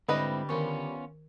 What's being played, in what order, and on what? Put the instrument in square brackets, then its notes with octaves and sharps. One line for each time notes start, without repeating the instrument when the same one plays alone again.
[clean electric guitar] G#2 C4 E4 [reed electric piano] D3 [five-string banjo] G3 B4 D#5
[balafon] D#3 A#4 C#6 [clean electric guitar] B3 C#4 F4